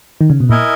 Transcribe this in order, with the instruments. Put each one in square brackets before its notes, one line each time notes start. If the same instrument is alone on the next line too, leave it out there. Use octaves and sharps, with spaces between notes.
[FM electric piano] D#3
C#3
B2
[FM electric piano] A#2 [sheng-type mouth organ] E4 A#4 D#5 G#5